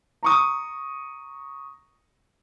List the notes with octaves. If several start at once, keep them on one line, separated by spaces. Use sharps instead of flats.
A#5 C#6 D#6